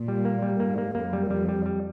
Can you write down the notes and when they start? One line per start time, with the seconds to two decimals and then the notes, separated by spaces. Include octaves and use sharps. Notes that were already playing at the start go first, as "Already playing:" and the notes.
Already playing: A#2
0.08 G3
0.25 A#3
0.42 G3
0.60 G#2 A#3
0.78 A#3
0.95 F#2 A#3
1.13 G3
1.30 F2 G3
1.49 G3
1.66 G3